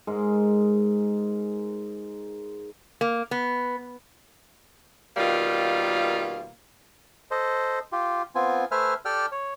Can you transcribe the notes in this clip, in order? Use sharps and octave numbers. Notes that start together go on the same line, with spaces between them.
G#2 G#3 A#4
A#3
B3
B2 D#3 G3 A#3 F4
A4 C5 D#5
F4 G4
B3 C4 F4 G#5
A3 B4 C5 E5 G#5 F6
G4 A4 D5 G5 E6 F6
C#5